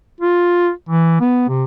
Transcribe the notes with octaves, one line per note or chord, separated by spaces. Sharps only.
F4
E3
B3
C3